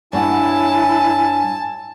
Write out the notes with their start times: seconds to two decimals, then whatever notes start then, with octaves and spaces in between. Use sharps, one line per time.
0.13 G2 E4 C#5 F#5 G#5 A5